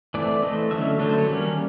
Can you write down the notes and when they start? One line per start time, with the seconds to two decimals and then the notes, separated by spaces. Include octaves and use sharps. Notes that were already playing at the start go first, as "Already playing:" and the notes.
0.14 E3 A3 C4 D5
0.42 E3 A3 C4 D#5
0.71 D3 F#3 A3 C#4 E5
0.99 D3 F#3 A3 C#4
1.09 C5
1.18 C#5
1.29 D#3 G3 A#3 C#4